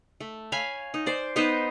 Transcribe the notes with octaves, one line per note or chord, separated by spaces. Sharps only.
A3
C#5 F5 G#5 B5
D#4
C5 D5
B3 D#4 B4 C5